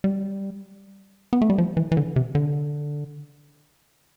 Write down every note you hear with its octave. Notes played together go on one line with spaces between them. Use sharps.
G3
B3
A3
G3
F3
E3
E3
D3
C3
D3